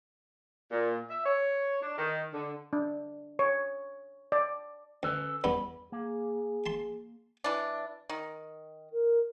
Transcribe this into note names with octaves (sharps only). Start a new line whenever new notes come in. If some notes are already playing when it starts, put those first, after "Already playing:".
A#2
E5
C#5
D4
D#3
D3
D4
C#5
D5
D2 C#4 A4 B4
E2 G2 B3 B5
A#3 G#4
A5 C6
E3 D4
D#3
A#4